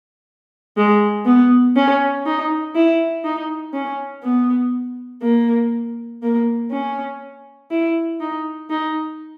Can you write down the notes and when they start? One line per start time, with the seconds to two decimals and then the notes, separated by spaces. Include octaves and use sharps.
0.77 G#3
1.26 B3
1.76 C#4
2.26 D#4
2.75 E4
3.24 D#4
3.74 C#4
4.23 B3
5.22 A#3
6.23 A#3
6.72 C#4
7.71 E4
8.20 D#4
8.70 D#4